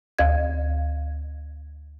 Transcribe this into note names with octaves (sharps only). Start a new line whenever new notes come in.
D2 F5 G#6